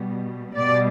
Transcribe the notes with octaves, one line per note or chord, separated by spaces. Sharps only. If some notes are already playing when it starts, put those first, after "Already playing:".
Already playing: B2 G3
B2 G3 D5